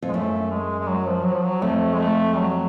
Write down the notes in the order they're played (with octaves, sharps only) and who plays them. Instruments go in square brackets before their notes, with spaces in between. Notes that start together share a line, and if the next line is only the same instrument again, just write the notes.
[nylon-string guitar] F2
[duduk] G#3
[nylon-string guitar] F#2 [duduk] A3
[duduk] G#3
G#3
F#3
F3
F#3
F3
F#3
[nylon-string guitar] F2 [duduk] A3
[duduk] G#3
A3
F#3